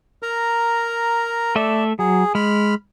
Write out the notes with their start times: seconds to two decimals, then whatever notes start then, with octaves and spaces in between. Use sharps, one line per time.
0.23 A#4 A#5
1.56 A3 A4 D5 E5
1.99 F#3 G#4
2.35 G#3 B5 F6